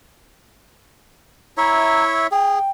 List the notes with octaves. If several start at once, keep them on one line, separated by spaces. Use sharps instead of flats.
E4 C#5 E5 A#5
G#4 G5